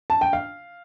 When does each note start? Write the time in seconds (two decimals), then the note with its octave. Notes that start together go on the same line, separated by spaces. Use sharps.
0.10 A5
0.21 G5
0.33 F5